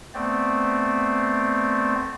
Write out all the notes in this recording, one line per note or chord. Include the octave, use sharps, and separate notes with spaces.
A3 B3 C4 C5 D5